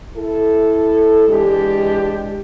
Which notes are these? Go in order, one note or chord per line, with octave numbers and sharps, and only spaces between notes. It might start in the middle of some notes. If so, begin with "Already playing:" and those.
E4 A4
E3 G#3 D4 G4